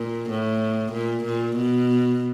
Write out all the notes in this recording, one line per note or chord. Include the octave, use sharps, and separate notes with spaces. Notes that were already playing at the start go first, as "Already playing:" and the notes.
Already playing: A#2
A2
A#2
A#2
B2